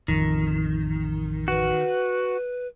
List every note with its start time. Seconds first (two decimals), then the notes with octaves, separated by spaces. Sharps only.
0.08 A1 F2 D#3
1.48 F#4 B4